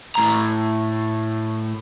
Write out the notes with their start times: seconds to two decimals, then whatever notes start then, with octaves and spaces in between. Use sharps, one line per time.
0.15 A2 A#5